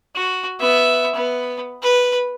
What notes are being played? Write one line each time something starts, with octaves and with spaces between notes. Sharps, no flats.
F#4
B3 E5
B3
B4